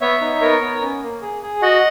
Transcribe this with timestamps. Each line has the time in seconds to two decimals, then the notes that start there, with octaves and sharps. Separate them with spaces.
0.01 B3 C#5 E5
0.21 D#4
0.41 B3 A#4 C#5
0.61 B3
0.82 C#4
1.02 A#3
1.22 G#4
1.42 G#4
1.62 F#4 D#5 F#5